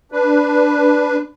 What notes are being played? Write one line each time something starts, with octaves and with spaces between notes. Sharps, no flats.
D4 B4